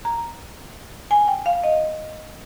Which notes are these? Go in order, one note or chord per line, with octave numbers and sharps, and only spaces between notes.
A#5
G#5
G5
F5
D#5